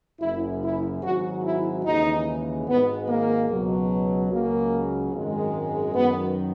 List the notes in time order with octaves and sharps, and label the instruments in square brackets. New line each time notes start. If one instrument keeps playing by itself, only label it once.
[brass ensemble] F#1 F#2 C#3 E4
E4
G#1 G#2 F#3 F#4
E4
D#2 C#3 E3 G#3 D#4
G#1 G#2 D#3 G#3 B3
A#3
C#2 B2 F#3
C#2 C#3 F#3 A#3
G#1 F#2 D#3 G#3
F#2 D#3 F#3 B3